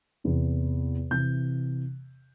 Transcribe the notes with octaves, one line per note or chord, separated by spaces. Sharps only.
E2 C3 E3
C3 E3 G6